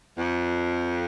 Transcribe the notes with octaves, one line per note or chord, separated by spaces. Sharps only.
F2